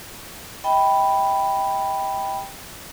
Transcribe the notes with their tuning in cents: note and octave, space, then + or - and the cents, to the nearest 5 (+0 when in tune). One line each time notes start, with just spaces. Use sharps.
D#5 +45 G5 +0 B5 +0